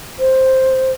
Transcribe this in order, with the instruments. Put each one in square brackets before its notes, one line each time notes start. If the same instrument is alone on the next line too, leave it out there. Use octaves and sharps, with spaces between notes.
[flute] C5